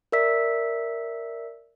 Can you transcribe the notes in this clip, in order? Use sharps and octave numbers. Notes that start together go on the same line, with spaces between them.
A#4 D5 E5 E6 B6